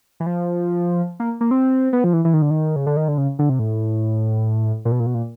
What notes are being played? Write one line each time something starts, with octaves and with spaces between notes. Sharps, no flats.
E3
F3
A#3
A#3
C4
B3
F3
E3
E3
D#3
D3
D#3
C#3
D3
D#3
D3
C#3
D3
C3
A2
A#2
B2
A#2
B2
A#2